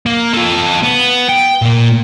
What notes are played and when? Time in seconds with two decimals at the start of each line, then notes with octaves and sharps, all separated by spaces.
0.06 A#3
0.33 F4 A4
0.83 B3
1.28 G5
1.62 A#2 A#3